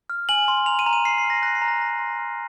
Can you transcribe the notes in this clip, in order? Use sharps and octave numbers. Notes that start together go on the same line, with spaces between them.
F6
G#5 F#7
C6
A#5 F7
D#7
A#5
D#7
A#5 C7
C7
F6
A#6
F#6 A#6
C7
A#5
A#6
C6 A#6
C6
F6